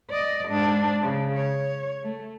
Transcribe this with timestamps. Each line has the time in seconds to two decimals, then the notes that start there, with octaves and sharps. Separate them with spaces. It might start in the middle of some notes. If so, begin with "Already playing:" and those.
0.10 D5 D#5
0.49 G#2 D4
1.01 C#3
1.36 C#5
2.03 A3